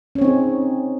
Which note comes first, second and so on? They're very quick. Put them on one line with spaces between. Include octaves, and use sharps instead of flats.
C#4 C#5 C4 D#4 G#4